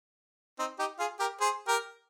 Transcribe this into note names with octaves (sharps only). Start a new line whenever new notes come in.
C4 D#4
D#4 G4
F4 G#4
G4 A#4
G#4 C5
G4 A#4